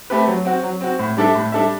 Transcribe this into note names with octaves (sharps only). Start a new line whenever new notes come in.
A3 C4 G4 B4
F#3
C4 F#4
F#3
C4 F#4
A2
G3 D4 A4 E5
A2
G3 D4 A4 E5